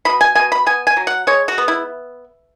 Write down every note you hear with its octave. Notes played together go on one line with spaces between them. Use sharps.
B2 B5
G#5
B2 G#5
B5
B3 G#5
G#5
F#3
F#5
G#3 C#5
F#4
B3
E4